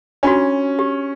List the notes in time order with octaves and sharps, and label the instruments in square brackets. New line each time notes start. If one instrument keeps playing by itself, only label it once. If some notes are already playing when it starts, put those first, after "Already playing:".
[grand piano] C#4 [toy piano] D4 F4 F#4
[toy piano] G4